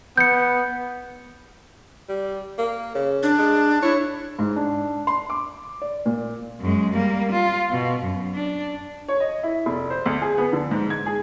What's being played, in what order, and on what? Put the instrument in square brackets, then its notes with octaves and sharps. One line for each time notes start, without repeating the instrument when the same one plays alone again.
[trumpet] B3 [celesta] G6 C#7
[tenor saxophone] G3
A#3
C#3
[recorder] D4
[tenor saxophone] G#3
[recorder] E4 [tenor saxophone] C#5
[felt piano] G#2
D4
C6
D6
D5
A#2
[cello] F#2 G#3
G3 A#3
F4
B2
F#2
D4
[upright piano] C#5
D#5
E4
F1
C5
D2
G#4
B3
D3
G#2
G#6
G#4